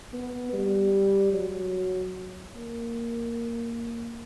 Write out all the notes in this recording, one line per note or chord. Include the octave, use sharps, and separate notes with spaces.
B3
G3
F#3
A#3